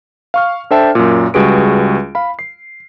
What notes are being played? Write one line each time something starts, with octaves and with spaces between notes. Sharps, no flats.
F5 C#6 F6
D4 A4 C5 E5 G5 A5
F#2 A#2
C#2 G3 F#4 G#4 B4 D7
F5 B5
C7